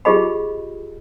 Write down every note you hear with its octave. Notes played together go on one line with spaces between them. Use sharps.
F4 G4 G#4 D#5 B5